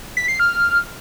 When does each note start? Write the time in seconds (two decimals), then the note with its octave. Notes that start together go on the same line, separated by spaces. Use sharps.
0.17 B6
0.28 C7
0.40 F6